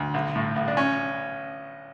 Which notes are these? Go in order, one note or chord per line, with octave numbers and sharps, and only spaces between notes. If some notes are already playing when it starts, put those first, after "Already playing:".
Already playing: D2
B1
A2
B1
D4
C#4